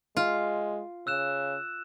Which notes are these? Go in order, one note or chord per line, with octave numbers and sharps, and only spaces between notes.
G#3 F4
C#3 E6 F#6 E7